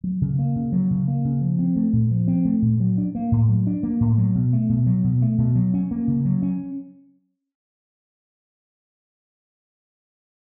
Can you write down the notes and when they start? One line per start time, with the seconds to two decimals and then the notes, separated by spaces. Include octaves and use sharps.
0.04 F#3
0.22 C#3
0.39 A#3
0.56 C#3
0.72 F#3
0.91 C#3
1.08 A#3
1.25 C#3
1.41 F3
1.59 C4
1.76 A3
1.93 A#2
2.11 F3
2.28 C4
2.45 A3
2.62 A#2
2.80 F#3
2.98 D4
3.15 A#3
3.32 A2
3.49 F#3
3.67 D4
3.83 A#3
4.00 A2
4.18 F#3
4.35 B2
4.53 A3
4.69 B2
4.86 F#3
5.04 B2
5.22 A3
5.38 B2
5.55 F#3
5.74 C#4
5.91 A#3
6.08 C#3
6.25 F#3
6.42 C#4